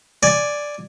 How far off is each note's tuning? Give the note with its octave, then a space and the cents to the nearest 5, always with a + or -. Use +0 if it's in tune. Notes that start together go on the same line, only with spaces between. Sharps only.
D5 +0 G#5 +0